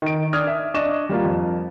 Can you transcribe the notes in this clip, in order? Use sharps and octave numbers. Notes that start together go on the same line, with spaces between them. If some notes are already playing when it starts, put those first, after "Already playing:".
D#3 D7
D4 D#6 F6 G#6
E5
D4 D#5 C#6 E7
G3 A#3 F4
F2